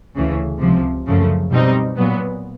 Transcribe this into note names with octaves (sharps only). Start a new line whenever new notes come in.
D2 C#3 E3
C#2 C3 F3
F#2 C#3 F3 A3
B2 G3 C4 D#4
A#2 F#3 B3